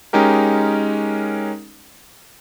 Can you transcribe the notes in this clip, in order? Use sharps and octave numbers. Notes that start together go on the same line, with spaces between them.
G#3 C#4 D#4 G4 A#4